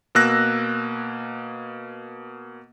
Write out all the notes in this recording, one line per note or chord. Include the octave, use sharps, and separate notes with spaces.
B2 A#3 E6 F#6 A#6